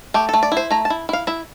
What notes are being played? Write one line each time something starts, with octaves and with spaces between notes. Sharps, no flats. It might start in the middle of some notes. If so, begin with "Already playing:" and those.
A3 G4
A3 A4
D5
E4
C5
A3 A#5
A5
E4
E4 F5
E4 E5